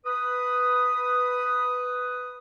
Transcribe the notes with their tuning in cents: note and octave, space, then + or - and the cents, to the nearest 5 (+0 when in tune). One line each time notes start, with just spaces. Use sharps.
B4 +5 D#6 +0